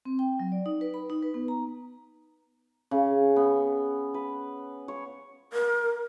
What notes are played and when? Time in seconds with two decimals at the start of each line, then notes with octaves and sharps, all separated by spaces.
0.05 C4
0.19 G5
0.39 F#3
0.52 D5
0.66 D#4
0.81 B4
0.94 B5
1.10 D#4
1.23 B4
1.34 B3
1.48 A#5
2.91 C#3
3.36 B3
4.14 B4
4.88 C#5
5.53 A#4